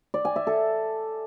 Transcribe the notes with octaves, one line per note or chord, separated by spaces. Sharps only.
D5
G#5
E5
A4